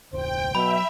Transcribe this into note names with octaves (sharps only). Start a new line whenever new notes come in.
F1 D2 C5 G5
B2 F#3 E5 B5